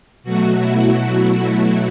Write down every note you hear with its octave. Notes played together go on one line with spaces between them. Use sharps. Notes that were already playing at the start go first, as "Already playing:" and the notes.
B2 F#3 A3 F#4
E4
E4